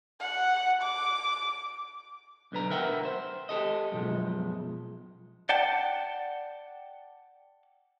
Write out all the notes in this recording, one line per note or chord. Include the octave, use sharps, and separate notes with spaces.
F#5
D6
B1 D3 B4 A#5
A#4 B4 E5 F#5 G5
C5
G4 A4 D#5
F#2 B2 F3 G#3
D5 F#5 G5 A5